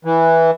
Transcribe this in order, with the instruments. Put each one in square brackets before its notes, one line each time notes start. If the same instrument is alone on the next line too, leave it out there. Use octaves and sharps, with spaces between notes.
[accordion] E3